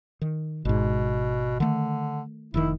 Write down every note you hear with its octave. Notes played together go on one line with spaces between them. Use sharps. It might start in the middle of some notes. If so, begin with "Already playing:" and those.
D#3
G#1 G#2 B2
D3 D#3 A3
F1 B2 D#3 E4